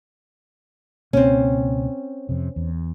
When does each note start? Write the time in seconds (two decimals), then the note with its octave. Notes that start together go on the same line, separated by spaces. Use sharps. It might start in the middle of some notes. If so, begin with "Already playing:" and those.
1.13 C#2 B2 A#3 C4 C#4
2.29 F2 C3
2.56 E2